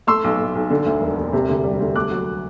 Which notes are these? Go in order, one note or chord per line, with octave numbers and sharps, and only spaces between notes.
A3 C6 E6
B1
A2
B1
D3
D2
E1
E1
C3
D2
G3
D2
A3 D6 F#6
F#3